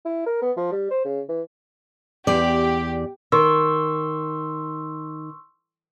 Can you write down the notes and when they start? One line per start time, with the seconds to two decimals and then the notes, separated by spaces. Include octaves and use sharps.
0.05 E4
0.26 A#4
0.42 B3
0.57 F3
0.72 G3
0.91 C5
1.05 C#3
1.29 E3
2.27 E2 G4 D5
3.32 D#3 C6 C#6 E6